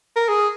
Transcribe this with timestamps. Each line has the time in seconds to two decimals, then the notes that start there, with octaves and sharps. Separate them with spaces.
0.16 A#4
0.28 G#4